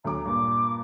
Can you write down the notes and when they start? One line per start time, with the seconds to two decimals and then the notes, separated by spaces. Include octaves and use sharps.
0.04 D2 F#3 A#5 D6
0.25 G2 A#2 D6